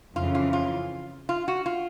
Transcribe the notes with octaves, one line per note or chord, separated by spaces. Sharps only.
F2 C#3 E3 F4
F4
F4
F4
F#4
F4